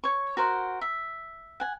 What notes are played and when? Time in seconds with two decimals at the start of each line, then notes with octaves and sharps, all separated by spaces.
0.04 C#5 C#6
0.37 F#4 A#4 C5 F#5
0.81 E5
1.60 F#5 G#5